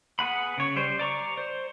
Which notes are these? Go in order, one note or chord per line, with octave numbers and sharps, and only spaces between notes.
B3 G#4 F#5 B5
C#3 C#5
G3 C5
D5 A#5 C#6
C5